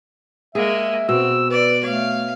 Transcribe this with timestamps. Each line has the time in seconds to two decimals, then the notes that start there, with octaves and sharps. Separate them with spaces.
0.55 G#3 A#3 G#4 E5
1.09 B2 C4 E6
1.51 B4 D5
1.83 A3 C#5 F5